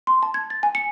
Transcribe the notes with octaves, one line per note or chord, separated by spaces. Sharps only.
C6
A5
G#6
A6
G#5
C#7